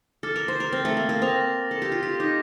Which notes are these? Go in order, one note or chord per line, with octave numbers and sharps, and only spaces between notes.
A4 D6 F6 A6
A#4
C5
A#4
C4
A3
A#3
A#3
C4 D#6 A#6 F7
A4
G4
F4
G4
D#4 D6 G6 A#6